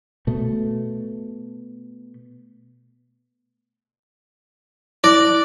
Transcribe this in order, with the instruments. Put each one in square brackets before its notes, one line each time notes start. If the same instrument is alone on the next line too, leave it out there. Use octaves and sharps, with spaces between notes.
[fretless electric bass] B2 A3
[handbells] E4 [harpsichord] D5